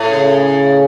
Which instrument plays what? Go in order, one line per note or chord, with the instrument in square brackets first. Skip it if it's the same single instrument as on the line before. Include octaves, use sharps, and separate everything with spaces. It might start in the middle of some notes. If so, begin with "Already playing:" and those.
Already playing: [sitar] A2
[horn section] C#3